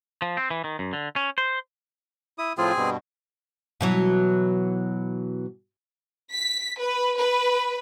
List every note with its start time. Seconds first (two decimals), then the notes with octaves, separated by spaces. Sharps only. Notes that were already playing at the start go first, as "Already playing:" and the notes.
0.22 F3
0.37 C4
0.51 E3
0.64 D#3
0.79 F#2
0.93 D3
1.16 C#4
1.38 C5
2.38 E4 D#6
2.58 A2 F3 C4 F4 G#4 G#5
2.77 G2 B2
3.81 B2 E3 F#3
6.31 B6
6.78 B4
7.18 B4